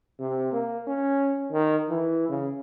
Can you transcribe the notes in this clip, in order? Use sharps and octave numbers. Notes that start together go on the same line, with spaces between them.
C3
A#3
C#4
D#3
E3
C#3